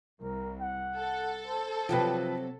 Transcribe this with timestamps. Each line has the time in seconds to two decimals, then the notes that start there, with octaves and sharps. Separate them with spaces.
0.22 C2 A#4
0.61 F#5
0.96 A4
1.46 C5
1.89 C3 F3 F#3 G4 B4